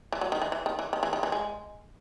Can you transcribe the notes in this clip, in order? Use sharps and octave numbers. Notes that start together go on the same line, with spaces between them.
E3
F#3
D#3
E3
E3
D#3
E3
D#3
E3
D#3
E3
G#3